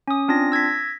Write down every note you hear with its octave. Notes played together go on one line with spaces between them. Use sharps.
C#4 D#6
C4 D4 F4 A#6
E6 G#6 A#6 B6